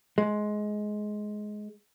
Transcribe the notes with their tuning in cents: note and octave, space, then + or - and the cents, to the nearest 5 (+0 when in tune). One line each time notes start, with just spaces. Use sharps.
G#3 +15